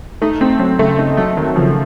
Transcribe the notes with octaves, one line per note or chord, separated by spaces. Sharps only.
A3 D#4
A3 C4
F#3 C4
C#3 A3
A3 D#4
F#3 A3
D#3 F#3
C#3 F3